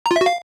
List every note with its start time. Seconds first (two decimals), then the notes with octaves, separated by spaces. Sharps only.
0.06 A#5
0.11 F4
0.16 E5
0.21 F#4
0.26 F5